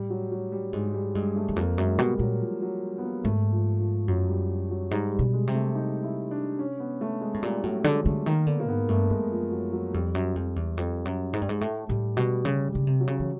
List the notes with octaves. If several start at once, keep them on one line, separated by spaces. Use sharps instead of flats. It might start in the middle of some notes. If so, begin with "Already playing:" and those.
Already playing: A2 G3
F#3
F#3
G3
G#2 G#3
G3
G2 G#3
A3
E2
F2 A#3
F#2 G#3
B2 G3
A#2 F#3
F3
F#3
B3
A#3
G#2 A3
F3
F3
F#2 F#3
G3
F#3
G#2 G3
G3
B2
G#3
C3
A3
D#4
E4
D4
C#4
B3
A3
G#3
A2
A#2 G3
A2 F#3
D3 G#3
D3 A3
D#3 A#3
D3 B3
A#3
G#2 B3
G2 A3
F#2 G#3
F3
F#3
F#3
F2 G3
F#2
F2
E2
F2
F#2
G#2
G2
G#2
A2 A3
A2 G3
B2 G3
C#3 G3
C#3 G3
C3
F#3
C#3
E3